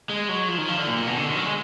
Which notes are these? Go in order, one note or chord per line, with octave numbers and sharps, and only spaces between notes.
G#3
F#3
F3
D#3
F3
D3
A#2
A#2
B2
D3
D#3
F#3
G#3